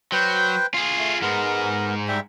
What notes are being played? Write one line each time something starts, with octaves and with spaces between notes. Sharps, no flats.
F#3 B4 C5 G5
F4 G#4
A3
G#2 G#3 B3 A#4
G3 E5 G5